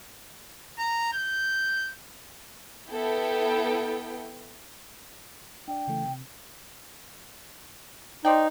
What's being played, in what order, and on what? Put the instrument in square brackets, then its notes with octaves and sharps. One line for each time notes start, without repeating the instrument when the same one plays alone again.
[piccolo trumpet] A#5
G6
[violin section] B3 E4 A4 G5
[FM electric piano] D4 D5 [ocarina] G5
[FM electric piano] C#3 E3 A3
C3
[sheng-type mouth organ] D#4 [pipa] C5 D5 G5